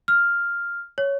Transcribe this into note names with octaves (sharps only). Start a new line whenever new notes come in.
F6
C#5